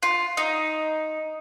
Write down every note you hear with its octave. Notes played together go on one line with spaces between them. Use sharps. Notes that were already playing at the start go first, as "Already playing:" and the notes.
F4
D#4